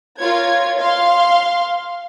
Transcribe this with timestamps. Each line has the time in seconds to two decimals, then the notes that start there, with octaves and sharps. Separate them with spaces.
0.18 F4 A#4 C#5 G#6
0.78 F5 C6